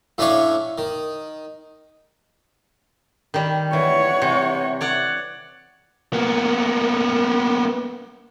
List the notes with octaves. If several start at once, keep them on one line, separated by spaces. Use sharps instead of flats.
A2 A3 C#4 D4 F5 C#6
D#3
D#3 G3
E3 C#5 F#5
C3
C#5 D5 F#5
A#3 B3